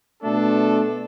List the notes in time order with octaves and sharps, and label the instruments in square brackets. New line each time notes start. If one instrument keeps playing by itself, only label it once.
[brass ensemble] B2 A3 D4 A4